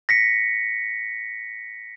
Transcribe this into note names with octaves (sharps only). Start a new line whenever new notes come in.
A#6 B6 C#7